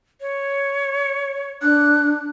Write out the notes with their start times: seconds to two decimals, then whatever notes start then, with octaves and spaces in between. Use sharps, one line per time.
0.21 C#5
1.63 D4 F#6